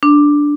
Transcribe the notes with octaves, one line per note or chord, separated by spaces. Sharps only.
D4